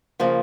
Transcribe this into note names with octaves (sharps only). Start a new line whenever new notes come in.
C#3 F3 A#3